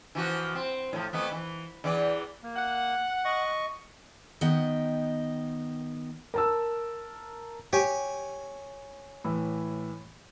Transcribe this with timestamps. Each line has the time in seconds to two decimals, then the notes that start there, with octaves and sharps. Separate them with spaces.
0.15 E3 F3 F#4
0.55 C4
0.93 A2 F3
1.13 F2 A3 B3
1.31 E3
1.84 E2 E3 D5
2.43 A#3
2.56 F#5
3.25 D#5 C#6
4.41 D#3 B3 D#5 G5
6.34 A#4 A5 E6
7.73 G4 C#5 G#5
9.24 A2 E3 B5